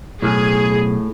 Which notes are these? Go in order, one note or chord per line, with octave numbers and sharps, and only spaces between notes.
B1 A2 G#4